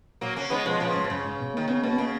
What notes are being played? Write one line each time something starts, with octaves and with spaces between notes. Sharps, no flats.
A#2 F#3 A#3
C#3 A#3 C#4
D#3 G#3 B3
B2 F3 G#3
A#2 C#3 F3
G#2
B2
F#2 C#3
G#2
B2
A#3
D#3
C#3 B3
B2 A#3
B3
C#3 A#3